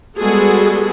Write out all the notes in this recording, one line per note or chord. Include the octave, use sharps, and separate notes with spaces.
G3 G#3 B3 F#4 G#4 A4